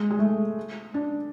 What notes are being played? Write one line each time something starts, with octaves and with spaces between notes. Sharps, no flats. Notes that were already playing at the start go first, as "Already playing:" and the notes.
Already playing: G#3
G#3
A3
D4